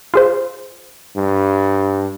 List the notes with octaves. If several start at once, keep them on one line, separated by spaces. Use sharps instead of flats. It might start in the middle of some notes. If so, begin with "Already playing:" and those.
F4 G#4 C5
G2